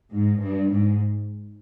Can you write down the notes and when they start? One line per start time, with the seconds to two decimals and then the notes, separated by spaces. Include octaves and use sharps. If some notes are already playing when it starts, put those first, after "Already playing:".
0.12 G#2
0.41 G2
0.70 G#2